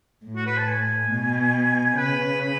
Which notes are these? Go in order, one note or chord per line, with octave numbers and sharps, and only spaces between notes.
A2
F#4
B4
A5
G#5
B2
C#3 B4
B4